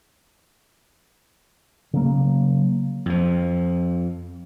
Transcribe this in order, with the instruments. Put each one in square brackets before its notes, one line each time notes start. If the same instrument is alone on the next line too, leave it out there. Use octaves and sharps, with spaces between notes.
[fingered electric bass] C#3 F#3 A#3
[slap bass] F2 F3